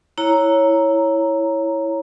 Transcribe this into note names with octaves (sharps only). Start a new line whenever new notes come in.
E4 C#5 A#5